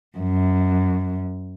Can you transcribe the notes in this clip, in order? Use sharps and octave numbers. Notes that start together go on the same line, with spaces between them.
F#2